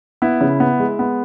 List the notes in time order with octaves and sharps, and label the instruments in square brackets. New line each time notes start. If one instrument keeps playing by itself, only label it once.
[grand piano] B3 E4
C#3
B3
G#3
B3